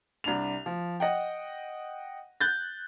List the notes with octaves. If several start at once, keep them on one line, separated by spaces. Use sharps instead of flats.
C2 D4 F7
F3
D#5 F#5 G5
F#6 G6 A6